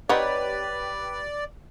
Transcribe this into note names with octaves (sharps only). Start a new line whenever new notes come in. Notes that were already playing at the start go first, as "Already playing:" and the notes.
C4 D#4 G4 B4 C#5 D5 F#5